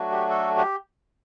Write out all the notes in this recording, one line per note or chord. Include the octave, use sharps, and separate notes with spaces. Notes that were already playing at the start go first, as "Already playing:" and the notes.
Already playing: F#3 A3 D4 F#4
G4
A4
G4